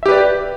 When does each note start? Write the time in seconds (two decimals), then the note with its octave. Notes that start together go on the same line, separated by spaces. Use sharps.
0.03 E5
0.06 G4
0.08 B4
0.11 D5